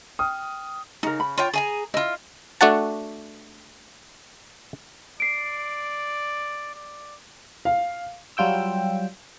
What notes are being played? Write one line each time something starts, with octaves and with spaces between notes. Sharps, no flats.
G5 D#6 F6
C#3 D#4 A#4
B5
F4 C#5 G5
G#4 G#5 A#5
E4 F4 D#5
A3 D4 F#4 F#5 A5
D5 C7 D7
D5
F5
F#3 G3 F4 G5 E6